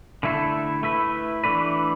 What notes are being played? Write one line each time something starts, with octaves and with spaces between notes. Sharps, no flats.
D3 A3 E4 A4
A3 E4 B4
E3 A3 D4 B4